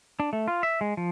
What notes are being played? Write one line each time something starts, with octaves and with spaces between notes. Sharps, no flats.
D4
A3
F4
E5
G#3
F3